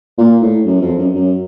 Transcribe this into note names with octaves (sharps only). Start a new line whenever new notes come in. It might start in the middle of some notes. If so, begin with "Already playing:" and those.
A#2
A2
F#2
F2
F#2
F#2